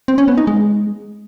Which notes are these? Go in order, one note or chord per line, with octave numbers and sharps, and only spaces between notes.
C4
C#4
B3
D#4
G#3